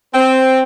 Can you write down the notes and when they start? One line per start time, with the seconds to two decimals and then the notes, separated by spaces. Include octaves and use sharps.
0.14 C4